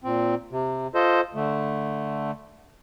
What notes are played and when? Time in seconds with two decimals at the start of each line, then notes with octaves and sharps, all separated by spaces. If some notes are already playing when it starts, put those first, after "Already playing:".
0.04 A#2 C4
0.51 C3
0.94 F4 A4 C5 D#5
1.34 D3 A3